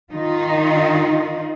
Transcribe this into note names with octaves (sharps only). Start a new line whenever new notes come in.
D#3 D#4 F4